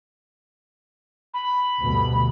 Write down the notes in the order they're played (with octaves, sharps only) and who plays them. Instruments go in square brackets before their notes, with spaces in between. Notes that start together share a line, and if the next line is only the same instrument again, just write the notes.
[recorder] B5
[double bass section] D2 G2 B2